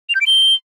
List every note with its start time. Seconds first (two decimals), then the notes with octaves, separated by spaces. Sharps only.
0.09 F7
0.15 G6
0.21 D7
0.27 G7